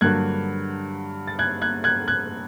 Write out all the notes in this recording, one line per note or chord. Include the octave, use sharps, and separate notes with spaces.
G2 D3 F#3 A#3 F#6 G#6
A6
F#6 G#6
F#6 G#6
F#6 G#6
F#6 G#6